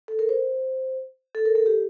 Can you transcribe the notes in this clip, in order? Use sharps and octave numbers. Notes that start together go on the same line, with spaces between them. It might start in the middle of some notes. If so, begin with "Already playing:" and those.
A4
A#4
C5
A4
A#4
A4
G4